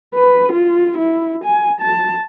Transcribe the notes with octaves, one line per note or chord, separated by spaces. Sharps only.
B4
F4
E4
G#5
A5